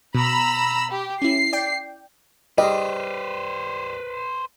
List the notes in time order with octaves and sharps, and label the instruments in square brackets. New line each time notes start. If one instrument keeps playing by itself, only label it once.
[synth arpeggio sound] B2 [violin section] A#5 B5 E6
[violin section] G4
[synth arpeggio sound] C#4 E4 [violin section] C7
[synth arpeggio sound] D5 G5
[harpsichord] G3 [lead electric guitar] B4 C5 [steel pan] D#5